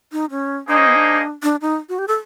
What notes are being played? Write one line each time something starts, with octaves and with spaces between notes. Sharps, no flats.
D#4
C#4
A#3 D4 D#4 G#4 C5 D#5
C#4
B3
D4
D4
D#4
F#4
G4
A4